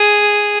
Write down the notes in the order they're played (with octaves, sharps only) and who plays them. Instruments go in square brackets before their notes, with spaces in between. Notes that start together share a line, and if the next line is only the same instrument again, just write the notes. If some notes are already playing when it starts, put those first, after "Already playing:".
Already playing: [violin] G#4